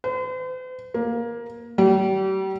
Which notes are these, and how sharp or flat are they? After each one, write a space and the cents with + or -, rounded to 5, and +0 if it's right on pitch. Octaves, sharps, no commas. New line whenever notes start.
C5 -45
A#3 +15
G3 -40